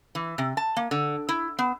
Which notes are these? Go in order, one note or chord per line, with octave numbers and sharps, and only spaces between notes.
E3
C3
A5
A#3
D3
E4
B3